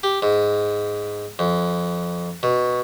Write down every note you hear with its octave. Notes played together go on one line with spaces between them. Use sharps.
G4
G#2
F2
B2